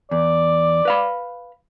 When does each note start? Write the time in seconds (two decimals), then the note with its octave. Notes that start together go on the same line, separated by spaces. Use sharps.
0.11 E2 D5
0.85 B4 F5 B5